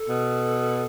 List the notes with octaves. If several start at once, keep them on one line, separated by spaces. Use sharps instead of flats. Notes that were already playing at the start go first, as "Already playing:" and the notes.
Already playing: A4
B2